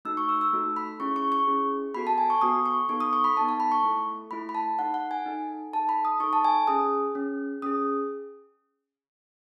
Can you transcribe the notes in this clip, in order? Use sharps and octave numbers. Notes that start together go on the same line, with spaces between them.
A3 D#4 F#4 A4 E6
C#6
E6
E6
A3 D#4 F#4 A4
B5
C#4 E4 G#4 C#6
C#6
C#6
C#4 E4 G#4
B3 F#4 A4 B5
A5
G#5
C#6
B3 F#4 A4 D#6
C#6
B3 D#4 A4 C#6
D#6
C#6
B5
B3 D#4 A4 A5
A5
B5
C#6
A3 E4 A4
A3 E4 A4 B5
B5
A5
D#4 A4 F#5
F#5
G#5
D#4 A4
D#4 A4 A5
B5
D#6
D#4 A4 C#6
A5
G#5
C#4 G#4 D#6
C#4 G#4
C#4 G#4 D#6